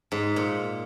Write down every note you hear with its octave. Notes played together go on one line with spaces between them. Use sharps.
G#2
A#2